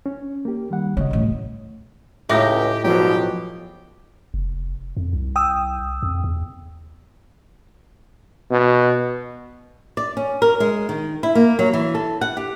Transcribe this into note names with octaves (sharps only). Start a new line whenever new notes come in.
C#4
A#3 G4
D#3 G3 F#5
C#3 F#3 C#5 D#5
A1 D2
C#2 A2 D#4 G4 E5 D6 A#6
E2 G#2 B2 F3 F#3 G4
F1
F2
C2
G5 D#6 E6
F2
E2
B2
D5
C#4
A#4
G#3
D#3
E4
A#3
F#3
E3
A4
F#5
G4